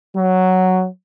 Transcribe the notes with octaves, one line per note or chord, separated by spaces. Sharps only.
F#3